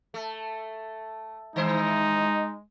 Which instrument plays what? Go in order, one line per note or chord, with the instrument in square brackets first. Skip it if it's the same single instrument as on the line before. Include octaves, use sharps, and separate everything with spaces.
[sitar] A3
[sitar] D#3 E4 C5 [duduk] G#3 [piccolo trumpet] D#4